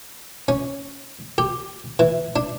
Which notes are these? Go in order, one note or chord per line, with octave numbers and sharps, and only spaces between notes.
C#4
G4
E3
D4